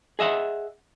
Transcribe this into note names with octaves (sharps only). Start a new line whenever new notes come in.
G#4 D#5 E5 F#5